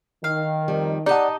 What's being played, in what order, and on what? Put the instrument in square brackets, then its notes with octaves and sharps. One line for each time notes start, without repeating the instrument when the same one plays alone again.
[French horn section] D#3 [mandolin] F5
[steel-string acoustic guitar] F2 G3
[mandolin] D#4 D#5 [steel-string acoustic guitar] G4 A5 [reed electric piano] D5 F#5